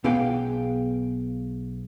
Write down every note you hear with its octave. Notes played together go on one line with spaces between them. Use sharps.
B1 B3 G#4 F5 G5